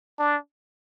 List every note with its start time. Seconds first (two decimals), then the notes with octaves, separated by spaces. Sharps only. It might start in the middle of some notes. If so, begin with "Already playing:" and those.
0.19 D4